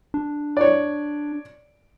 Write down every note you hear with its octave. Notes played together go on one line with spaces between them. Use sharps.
D4
C#5 D5